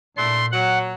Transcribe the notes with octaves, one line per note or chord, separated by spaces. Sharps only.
A#2 A3 D4 E4 C6
F#3 F#5